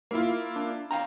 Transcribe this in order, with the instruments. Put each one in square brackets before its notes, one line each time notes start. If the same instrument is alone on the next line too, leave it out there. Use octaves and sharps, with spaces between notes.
[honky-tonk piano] A#3 E4 F4
[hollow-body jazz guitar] D4
F5 G5 A#5